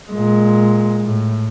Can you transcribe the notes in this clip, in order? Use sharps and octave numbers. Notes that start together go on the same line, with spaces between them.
A#2 G#3
A2